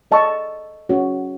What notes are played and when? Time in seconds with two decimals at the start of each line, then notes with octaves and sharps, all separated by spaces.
0.11 A4 D#5 A5 C#6
0.89 C#4 F#4 C#5